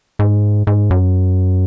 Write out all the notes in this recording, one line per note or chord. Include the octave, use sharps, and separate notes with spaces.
G#2
G#2
F#2